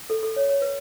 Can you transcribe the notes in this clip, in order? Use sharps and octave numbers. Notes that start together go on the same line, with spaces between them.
A4
A4
C#5
C#5
B4